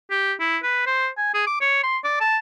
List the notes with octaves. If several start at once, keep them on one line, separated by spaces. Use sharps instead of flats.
G4
E4
B4
C5
G#5
G#4
D6
C#5
C6
D5
A5